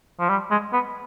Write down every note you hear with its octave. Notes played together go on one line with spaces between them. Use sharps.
F3
G3
G#3
B3